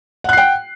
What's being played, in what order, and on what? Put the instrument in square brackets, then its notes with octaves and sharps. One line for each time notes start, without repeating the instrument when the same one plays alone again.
[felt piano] F#5
F#6
C7
G5